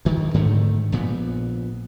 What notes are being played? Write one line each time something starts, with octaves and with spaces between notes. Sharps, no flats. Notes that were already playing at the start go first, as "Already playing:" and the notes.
D2 D#3
G#2 D3 D#3 A3
A#1 A#2 B3